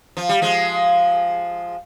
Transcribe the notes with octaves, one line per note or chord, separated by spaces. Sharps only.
F3
G3
F3 G#3